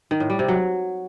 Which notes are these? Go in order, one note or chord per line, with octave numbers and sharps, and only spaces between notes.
D#3
A2
G3
C3
F#3